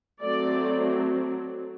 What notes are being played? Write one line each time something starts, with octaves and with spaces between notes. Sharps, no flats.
F#3 A3 C4 D5